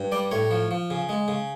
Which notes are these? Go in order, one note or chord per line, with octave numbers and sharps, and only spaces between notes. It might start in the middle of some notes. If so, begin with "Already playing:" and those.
Already playing: G2
G3 D5
A2 C#5
F3
F3
C#3
G#3
C#3